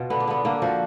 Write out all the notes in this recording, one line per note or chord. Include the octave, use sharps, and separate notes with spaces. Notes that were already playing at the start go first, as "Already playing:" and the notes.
Already playing: B2 F4
D3 B3
D4
D3 B3
D3 A#3
F3 F#4